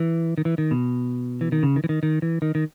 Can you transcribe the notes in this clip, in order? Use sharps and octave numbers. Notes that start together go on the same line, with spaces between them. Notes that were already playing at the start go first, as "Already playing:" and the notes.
Already playing: E3
D#3
E3
D#3
B2
E3
D#3
C#3
D#3
E3
D#3
D#3
E3
D#3
D#3